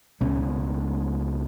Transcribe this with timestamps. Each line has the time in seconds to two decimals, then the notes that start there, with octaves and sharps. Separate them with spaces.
0.21 C#2 B2 G#3 C#4